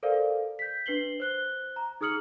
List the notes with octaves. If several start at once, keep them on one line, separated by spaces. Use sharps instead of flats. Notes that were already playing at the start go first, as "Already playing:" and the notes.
A4 A#4 C5 D5 F5
G6 B6
D4 B4 C7 F#7 G7
C5 F#6 G7
A#5
D#4 G#4 D#6 F6 C#7 F#7